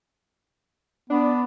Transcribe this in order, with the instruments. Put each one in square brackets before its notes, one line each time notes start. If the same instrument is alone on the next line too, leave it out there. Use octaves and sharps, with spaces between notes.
[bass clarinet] B3 [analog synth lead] D4